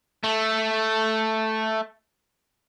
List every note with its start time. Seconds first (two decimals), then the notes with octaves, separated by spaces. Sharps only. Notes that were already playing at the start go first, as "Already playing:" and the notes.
0.24 A3